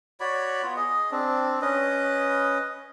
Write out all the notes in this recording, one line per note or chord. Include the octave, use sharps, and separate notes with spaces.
F#4 C#5 D5 B5
B3 F4
G#4 D#5
C4 D4
C#4 B4 D#5